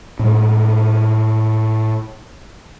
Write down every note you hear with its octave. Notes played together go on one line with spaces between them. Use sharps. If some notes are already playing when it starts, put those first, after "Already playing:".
A2 G#3